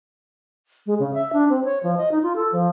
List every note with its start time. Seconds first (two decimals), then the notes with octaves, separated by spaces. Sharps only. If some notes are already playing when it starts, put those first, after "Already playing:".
0.86 G#3
0.99 C#3
1.14 E5
1.33 D4
1.50 C4
1.65 C#5
1.83 F3
1.97 D#5
2.11 D#4
2.23 F4
2.36 A4
2.52 F3